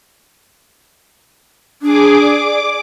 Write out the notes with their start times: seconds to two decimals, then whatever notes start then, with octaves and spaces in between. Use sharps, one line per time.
1.82 D4 G#4 D6
2.21 D5 D6